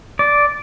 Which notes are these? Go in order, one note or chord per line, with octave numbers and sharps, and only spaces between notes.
D5